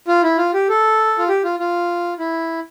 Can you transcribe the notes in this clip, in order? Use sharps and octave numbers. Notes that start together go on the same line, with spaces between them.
F4
E4
F4
G4
A4
F4
G4
F4
F4
E4